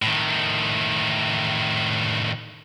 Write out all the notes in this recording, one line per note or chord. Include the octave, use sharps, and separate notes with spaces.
A2 D#3